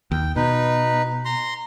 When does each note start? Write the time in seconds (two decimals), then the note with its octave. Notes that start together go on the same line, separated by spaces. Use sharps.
0.11 D#2 G5
0.36 B2 D#4 B4
1.25 A#5 C6